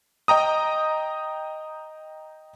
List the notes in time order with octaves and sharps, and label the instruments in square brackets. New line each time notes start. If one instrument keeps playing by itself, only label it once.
[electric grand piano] D#5 G5 A#5 D#6